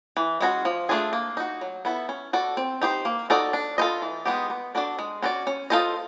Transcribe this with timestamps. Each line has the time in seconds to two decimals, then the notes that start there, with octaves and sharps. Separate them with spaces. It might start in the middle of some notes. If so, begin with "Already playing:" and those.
0.17 E3
0.41 G#3 C#4 F#4
0.65 F3
0.89 A3 D4 F4 G#4
1.13 A#3
1.37 D#4 F#4
1.61 F#3
1.85 B3 E4 A4
2.09 C#4
2.33 F#4 A4 D5
2.57 C4
2.82 D#4 G4 C5
3.05 A#3
3.30 D#4 F#4 A4 D5
3.53 D4
3.78 F4 A4 C5 D#5
4.02 E3
4.25 G#3 B3 D#4 G4
4.50 B3
4.75 D4 F#4 A4 D5
4.99 G#3
5.22 C#4 F#4 B4 D5
5.47 C#4
5.70 F4 A4 C5 D#5